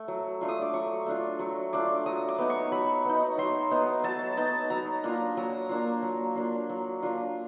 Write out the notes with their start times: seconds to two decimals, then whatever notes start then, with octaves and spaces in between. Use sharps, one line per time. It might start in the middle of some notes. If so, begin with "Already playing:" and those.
Already playing: A3
0.08 F#3
0.41 A3 D4 F4
0.48 D#6
0.62 D6
0.73 F#3 C#6
1.06 A3 D4 F4
1.39 F#3 C#6
1.73 A3 D4 F4 D6
2.06 F#3 D#6
2.29 D6
2.38 B3 D#4
2.50 C#6
2.72 F#3 B5
3.05 B3 D#4
3.38 F#3 C6
3.71 B3 D#4
4.04 F#3 A5
4.37 B3 D#4 A5
4.70 F#3 A#5
5.04 A#3 D4 F4
5.37 F#3 A#5
5.69 A#3 D4 F4
6.02 F#3
6.36 A#3 D4 F4
6.70 F#3
7.03 A#3 D4 F4